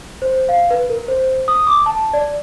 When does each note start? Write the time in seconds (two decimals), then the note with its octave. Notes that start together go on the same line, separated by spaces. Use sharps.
0.22 C5
0.49 F5
0.71 B4
0.90 A#4
1.08 C5
1.48 D#6
1.67 D6
1.86 A5
2.13 D5